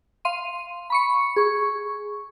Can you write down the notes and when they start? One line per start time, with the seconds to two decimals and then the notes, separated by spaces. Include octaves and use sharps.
0.25 F5 C6 D#7
0.90 B5 C#6 C#7
1.36 G#4 C#6